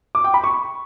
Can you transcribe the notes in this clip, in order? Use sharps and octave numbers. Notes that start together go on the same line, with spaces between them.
D6
G5
B5
C#6